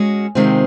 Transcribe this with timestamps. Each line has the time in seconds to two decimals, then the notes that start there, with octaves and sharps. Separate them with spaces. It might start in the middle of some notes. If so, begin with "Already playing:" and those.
Already playing: G#3 C#4 F#4
0.35 C3 D#3 G#3 C4 F4